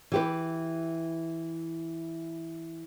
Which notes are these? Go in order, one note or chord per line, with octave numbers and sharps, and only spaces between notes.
E3 G4 B4